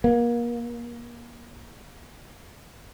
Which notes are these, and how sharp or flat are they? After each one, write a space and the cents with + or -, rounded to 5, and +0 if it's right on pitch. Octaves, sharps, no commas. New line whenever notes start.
A#3 +30